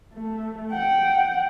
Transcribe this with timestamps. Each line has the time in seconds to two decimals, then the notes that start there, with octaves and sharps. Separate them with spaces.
0.14 A3
0.71 F#5 G5